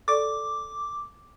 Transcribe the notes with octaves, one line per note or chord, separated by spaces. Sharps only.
A4 D5 C#6 D6